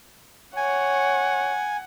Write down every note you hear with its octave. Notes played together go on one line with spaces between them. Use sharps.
C#5 F#5 G#5